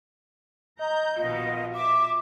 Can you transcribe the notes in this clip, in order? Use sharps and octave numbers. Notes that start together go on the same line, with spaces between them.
D#5 A#5 G6
A#1 B2 D#3 F4 D#5
E5 D6